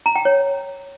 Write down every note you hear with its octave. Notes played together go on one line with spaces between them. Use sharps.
A#5
G5
C#5